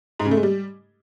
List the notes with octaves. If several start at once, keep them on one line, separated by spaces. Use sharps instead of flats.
G#2
C#3
A3
G#3
G3